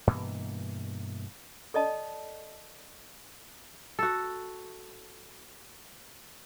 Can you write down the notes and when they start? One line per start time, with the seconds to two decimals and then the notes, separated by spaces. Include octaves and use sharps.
0.07 G2 B2 E3 A#3
1.74 A4 D5 D#5 A5
3.99 F#4 A4